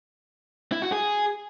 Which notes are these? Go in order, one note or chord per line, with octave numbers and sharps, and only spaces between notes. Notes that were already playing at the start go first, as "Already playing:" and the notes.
E4
F#4
G#4